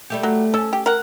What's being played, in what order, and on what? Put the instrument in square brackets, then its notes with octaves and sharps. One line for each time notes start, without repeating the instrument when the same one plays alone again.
[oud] G3 A3 G4
[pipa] F#3
[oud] C#4 [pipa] A4
[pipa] G4
A#4 F#5